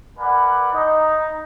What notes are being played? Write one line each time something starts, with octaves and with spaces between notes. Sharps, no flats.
A#4 B4 D5 F#5 G#5 B5
D#4